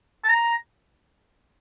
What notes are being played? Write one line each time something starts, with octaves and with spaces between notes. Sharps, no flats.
A5
A#5